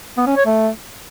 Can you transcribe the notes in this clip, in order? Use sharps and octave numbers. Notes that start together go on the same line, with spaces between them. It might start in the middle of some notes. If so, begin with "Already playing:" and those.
B3
C#4
C#5
A3